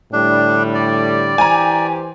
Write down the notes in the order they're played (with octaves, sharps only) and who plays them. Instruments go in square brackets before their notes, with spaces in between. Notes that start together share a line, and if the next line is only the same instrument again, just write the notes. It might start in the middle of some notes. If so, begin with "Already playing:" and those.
[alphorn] A2 [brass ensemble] D3 G3 [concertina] D4
[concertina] D5
[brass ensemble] E3 G4 C5 [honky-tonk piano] G#5 A#5